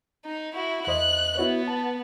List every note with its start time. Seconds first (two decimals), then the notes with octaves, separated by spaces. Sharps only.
0.25 D#4
0.55 E4 F#4
0.87 E2 C5 D#5 F#6
1.37 B3 E4 F#4 C#5
1.68 A5